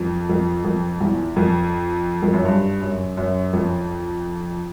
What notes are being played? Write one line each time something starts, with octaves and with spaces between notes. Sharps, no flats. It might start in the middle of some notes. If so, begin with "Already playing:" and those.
Already playing: F2
F2
F2
E2
F2
F2
F#2
G2
F#2
F#2
F2